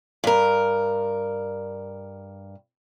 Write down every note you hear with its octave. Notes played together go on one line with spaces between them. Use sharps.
G2 A#4